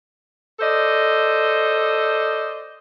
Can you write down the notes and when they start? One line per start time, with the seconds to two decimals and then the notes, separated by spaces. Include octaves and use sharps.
0.60 A4 C5 D5 D#5